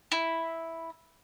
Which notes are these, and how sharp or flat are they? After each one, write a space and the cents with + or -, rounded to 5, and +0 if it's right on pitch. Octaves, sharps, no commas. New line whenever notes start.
E4 -5